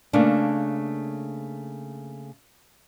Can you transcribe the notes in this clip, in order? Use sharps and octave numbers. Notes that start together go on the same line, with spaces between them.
C#3 A3 A#3 D4